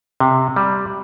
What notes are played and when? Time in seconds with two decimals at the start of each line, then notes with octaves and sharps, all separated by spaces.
0.20 C3
0.56 G3